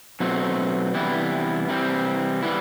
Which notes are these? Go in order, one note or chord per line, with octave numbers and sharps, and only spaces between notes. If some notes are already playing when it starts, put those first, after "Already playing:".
B2 F#3 A3 C4
C3 E3 G3 B3 E4
C3 E3 G3 C4
E3 G3 B3 E4